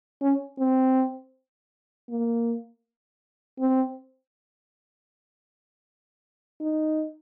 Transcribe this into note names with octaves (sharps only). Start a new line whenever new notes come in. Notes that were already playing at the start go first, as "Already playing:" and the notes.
C#4
C4
A#3
C4
D#4